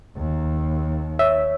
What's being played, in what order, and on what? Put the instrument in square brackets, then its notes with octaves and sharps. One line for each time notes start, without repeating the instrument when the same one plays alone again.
[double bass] D#2
[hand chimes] C#5 [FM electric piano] E5